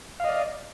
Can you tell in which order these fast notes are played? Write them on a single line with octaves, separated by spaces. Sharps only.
F5 D#5 D5